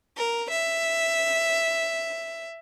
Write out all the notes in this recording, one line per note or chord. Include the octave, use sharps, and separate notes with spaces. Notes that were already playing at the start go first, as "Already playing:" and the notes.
A#4
E5